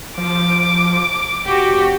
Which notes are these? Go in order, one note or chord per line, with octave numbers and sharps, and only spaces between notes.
F3 D6
F1 F#4 G4